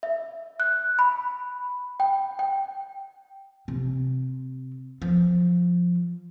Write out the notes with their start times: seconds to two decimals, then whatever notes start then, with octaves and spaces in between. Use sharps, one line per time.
0.03 E5
0.60 F#6
0.99 B5
2.00 G5
2.39 G5
3.68 C3
5.02 F3